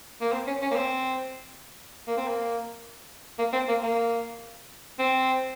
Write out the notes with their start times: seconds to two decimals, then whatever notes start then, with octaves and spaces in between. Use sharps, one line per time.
0.21 A#3
0.32 C4
0.47 C#4
0.61 C#4
0.71 A#3
0.76 C4
2.07 A#3
2.17 C4
2.27 A#3
3.39 A#3
3.53 C4
3.68 A#3
3.83 A#3
4.99 C4